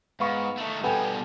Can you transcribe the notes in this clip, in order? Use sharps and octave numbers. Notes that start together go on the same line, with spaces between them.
G#2 B3 F5 C#6
D#3 A3
B2 G3 B3 A4 G5 G#5